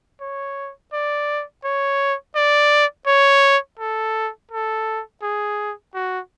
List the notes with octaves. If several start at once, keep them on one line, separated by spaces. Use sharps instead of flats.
C#5
D5
C#5
D5
C#5
A4
A4
G#4
F#4